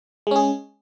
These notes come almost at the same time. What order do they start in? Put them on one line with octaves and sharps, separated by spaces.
G#3 C#4 G#4